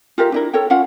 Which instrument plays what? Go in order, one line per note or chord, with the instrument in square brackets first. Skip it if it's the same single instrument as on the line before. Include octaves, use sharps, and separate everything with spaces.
[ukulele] F4 G4 A#4 E5
D4 E4 A#4
A4 A#4 C#5 G5
C#4 F4 F5 F#5